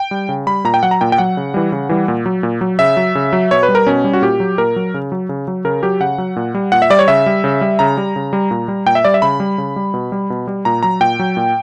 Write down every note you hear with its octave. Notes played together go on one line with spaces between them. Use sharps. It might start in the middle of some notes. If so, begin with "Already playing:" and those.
Already playing: G5
G3
C#3
G3 B5
A#2 A#5
G5
F#3 F#5
A#5
A#2 G5
G5
F#3 F#5
C#3
E3 G3
C#3
E3 G3
A#2
F#3
A#2
F#3
C#3 E5
F#3
C#3
F#3
B2 C#5
B4
G3
A#4
B2 C#4
G3
F#4
A#2 G4
F#3
A#2 A#4
F#3
C#3
F#3
C#3
F#3
C#3 A#4
F#3 G4
C#3 F#5
F#3
A#2
G3
A#2 F#5
E5
G3 D5
C#5
C#3 E5
G3
C#3
G3
C#3 A#5
G3
C#3
G3
A#2
G3
A#2 G5
E5
G3 D5
E5
C#3 B5
G3
C#3
G3
B2
G3
B2
G3
A#2 A#5
F#3 A#5
A#2 G5
F#3
A#2